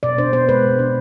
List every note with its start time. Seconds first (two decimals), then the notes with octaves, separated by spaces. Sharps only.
0.03 B2 D5
0.18 D4 C5
0.33 B3 C5
0.49 G#3 B4
0.64 B2
0.79 D4